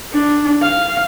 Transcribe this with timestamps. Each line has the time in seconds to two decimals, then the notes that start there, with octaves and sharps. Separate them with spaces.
0.13 D4
0.62 F5